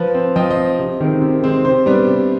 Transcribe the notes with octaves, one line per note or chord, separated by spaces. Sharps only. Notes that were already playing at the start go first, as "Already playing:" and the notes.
Already playing: F3 B4
C4
F3 D#5 G5
C5 D#5
C4
C5
C3
D#3 G#3 C4
C3
D#3 G#3 C4
C3 C5
G3 B3 D4
C3